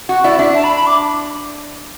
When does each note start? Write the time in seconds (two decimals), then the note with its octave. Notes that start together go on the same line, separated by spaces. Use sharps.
0.09 F#4 F#5
0.24 E4 D5
0.38 D4 E5
0.54 A5
0.64 B5
0.76 B5
0.87 D6